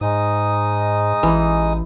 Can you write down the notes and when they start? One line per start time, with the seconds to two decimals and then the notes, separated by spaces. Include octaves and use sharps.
0.01 G#2 G#3 D#4 D#6
1.23 A1 E3